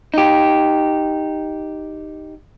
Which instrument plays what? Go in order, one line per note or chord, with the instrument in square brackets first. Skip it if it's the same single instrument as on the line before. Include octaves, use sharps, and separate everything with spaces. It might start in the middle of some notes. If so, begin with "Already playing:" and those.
[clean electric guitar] D#4 G4